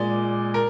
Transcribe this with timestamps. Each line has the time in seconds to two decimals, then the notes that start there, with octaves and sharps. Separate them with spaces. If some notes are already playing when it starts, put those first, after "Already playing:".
Already playing: A#2 G#3 D5
0.54 A#4